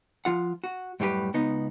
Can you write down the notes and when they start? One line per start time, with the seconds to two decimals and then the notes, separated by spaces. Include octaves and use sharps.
0.25 F3 F4 F#5
0.64 F#4
1.00 F#2 A2 G3 G4 B4
1.34 C#2 B3 D#4